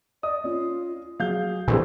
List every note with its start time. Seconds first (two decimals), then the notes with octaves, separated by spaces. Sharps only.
0.23 D5 D#5 D#6
0.44 C#4 F4
1.20 F#3 G#4 F5 G6
1.68 A#1 E3 G3 C4 G#4 A4